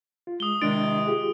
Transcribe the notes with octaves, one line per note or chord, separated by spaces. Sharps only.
F4
G#3 D#6 G7
C3 D#3 G#3 D4 E4 A6 D7
F4 G4 G#4